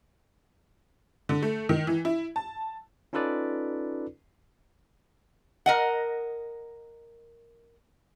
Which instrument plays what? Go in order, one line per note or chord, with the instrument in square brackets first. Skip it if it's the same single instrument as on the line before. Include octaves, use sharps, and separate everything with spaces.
[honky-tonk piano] D3
A3
D#3
E3
E4
A5
[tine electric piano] C#4 D#4 F4 A4 B4 D5
[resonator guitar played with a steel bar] A#4 D#5 F#5